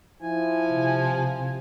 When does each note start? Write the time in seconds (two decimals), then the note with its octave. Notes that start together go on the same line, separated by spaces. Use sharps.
0.22 F3 E4 G#5
0.69 C3